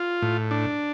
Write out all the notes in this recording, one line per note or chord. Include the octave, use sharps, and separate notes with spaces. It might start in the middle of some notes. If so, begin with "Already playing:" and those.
Already playing: F4
A2
D4